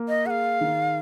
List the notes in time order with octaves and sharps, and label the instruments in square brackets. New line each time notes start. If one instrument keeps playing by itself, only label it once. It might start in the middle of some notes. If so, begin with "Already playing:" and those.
Already playing: [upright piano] A#3
[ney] D#5
[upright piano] G#4 [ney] F#5
[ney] F5
[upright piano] D#3